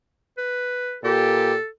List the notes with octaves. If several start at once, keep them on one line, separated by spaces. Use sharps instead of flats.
B4
A#2 G4 A4